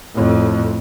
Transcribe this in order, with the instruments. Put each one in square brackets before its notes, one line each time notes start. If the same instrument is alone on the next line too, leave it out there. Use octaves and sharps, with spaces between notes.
[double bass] F2 A2